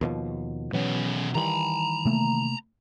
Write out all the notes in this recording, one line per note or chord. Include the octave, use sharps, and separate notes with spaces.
D#2 B2 F3
B2 E3 F#3 B3 C#4
D#3 E3 G3 A#5 B5
C3 A3 A#3